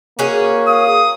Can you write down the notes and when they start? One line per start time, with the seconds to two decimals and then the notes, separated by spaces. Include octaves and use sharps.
0.19 A#3 C#4 F#4 G#4
0.68 F5 D#6